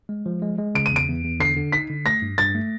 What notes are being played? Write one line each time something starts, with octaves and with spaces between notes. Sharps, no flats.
G#3
F3
G#3
G#3
C#3 D7
D#7
E2 D7
E2
E2
D3 C7
D3
D#4 B6
D3
A3 A#6
G2
G2 A6
A3